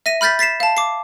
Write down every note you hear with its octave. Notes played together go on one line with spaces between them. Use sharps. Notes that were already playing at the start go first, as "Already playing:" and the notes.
E5 A#6 D#7
B5 F6 G6 A6 B6
A6 B6 C7 E7
F5 A5
D6 C7